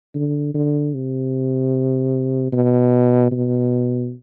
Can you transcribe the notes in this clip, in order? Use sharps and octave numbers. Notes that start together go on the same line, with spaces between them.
D3
D3
C3
B2
B2